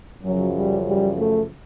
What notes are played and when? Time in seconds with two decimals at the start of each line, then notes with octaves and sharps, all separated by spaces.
0.23 F#2 C#3 F3 F#3
0.56 G3
0.87 G3
1.18 A3